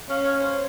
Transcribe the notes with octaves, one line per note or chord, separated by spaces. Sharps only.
C#4 F5
C#5
C5